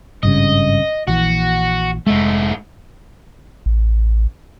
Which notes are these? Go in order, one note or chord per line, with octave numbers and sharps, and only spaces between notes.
G#1 G2 C#3 D#5
A#1 E3 F#4
F1 G#2 G#3 A3
A1